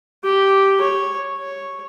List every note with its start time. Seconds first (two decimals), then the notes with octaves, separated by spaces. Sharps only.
0.23 G4
0.81 C#5
1.38 C#5